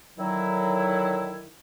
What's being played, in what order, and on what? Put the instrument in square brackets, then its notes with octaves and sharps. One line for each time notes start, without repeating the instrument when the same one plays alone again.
[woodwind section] D3 D#3 F#3 E4